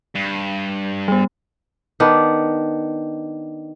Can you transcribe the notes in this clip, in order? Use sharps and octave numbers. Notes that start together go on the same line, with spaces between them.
G2
G3 B3
D#3 B3 D4